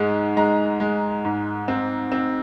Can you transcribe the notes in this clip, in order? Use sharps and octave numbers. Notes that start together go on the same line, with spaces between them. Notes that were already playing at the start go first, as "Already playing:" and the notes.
Already playing: G#2 G#3
G#3 A#5
G#3
G#2
C4
C4